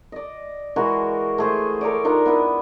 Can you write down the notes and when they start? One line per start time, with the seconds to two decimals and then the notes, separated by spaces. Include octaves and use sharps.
0.12 D5 D#5
0.76 E3 G#3 F#4 A#4
1.38 A3 G#4 C5
1.81 A4 A#4 C#5 D5
2.04 D4 D#4 F4 A#4
2.25 B3 E4 B4